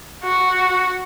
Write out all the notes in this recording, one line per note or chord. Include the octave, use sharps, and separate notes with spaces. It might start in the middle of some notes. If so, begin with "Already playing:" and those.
F#4